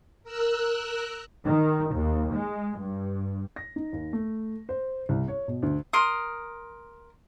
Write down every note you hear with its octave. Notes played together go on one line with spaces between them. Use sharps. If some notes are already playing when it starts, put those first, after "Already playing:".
A#4 E6 F#6
D#3
D#2
G#3
G2
A#6
D#4
D#2
A3
C5
C2
C#5
B2
D2
A#4 C6 D#6